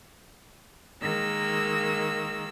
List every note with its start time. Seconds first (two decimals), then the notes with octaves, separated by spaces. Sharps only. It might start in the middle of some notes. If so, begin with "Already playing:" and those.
1.02 D#3 G#3 A#3 E6